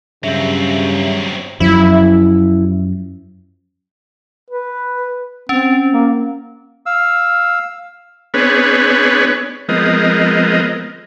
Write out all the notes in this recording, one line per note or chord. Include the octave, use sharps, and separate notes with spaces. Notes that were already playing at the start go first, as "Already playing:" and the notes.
G2 C#3 F#3 C4 E5
F#2 F3 E4
B4
C4 C#4
A#3
F5 E6
B3 C4 D4 G#4 B4 C#5
F3 G#3 B3 C4 A#4 D#5